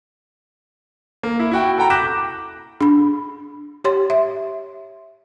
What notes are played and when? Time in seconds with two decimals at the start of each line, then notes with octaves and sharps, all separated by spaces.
1.23 A#3
1.39 E4
1.51 E4 F#4 G5
1.78 A4 F#5 G5 A#5
1.90 D6 F#6 G6 A#6 B6 E7
2.81 D4 B5
3.84 G4 C#5 C6
4.10 E5